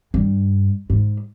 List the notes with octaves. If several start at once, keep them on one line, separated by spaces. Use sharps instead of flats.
G2
G#2